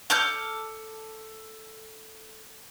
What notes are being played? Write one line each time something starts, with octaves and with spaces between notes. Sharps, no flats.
A4 D6 F6 G6